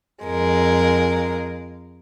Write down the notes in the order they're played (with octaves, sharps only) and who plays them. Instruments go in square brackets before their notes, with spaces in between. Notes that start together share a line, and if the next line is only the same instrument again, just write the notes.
[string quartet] F2 G#3 A#4